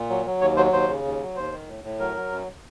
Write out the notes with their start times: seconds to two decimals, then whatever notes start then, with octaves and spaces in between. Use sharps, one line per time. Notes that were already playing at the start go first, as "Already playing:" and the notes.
Already playing: A#2
0.10 F#3
0.26 F#3
0.41 D#2 C#5
0.57 F#3 C5
0.72 D#2 C5
0.89 C#3
1.05 D#2
1.20 F#3
1.36 D#2 C5
1.52 D#3
1.68 A2
1.84 A2
1.99 F#3 A#4
2.16 F#3
2.32 F#2